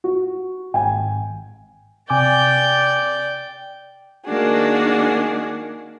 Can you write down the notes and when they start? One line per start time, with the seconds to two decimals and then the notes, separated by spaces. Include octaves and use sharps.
0.04 F#4
0.74 G#1 G5 G#5
2.10 C3 D5 G5 G#5 D6
4.26 D#3 A#3 D4 F#4 G#4